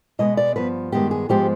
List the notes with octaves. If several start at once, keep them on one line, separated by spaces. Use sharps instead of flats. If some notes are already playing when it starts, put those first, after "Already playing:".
B2 G#3 B3 D#5
D5
G2 F3 B3 B4
G2 D#3 G#3 B3 G4
G#4
G#2 F3 G#3 B3 G4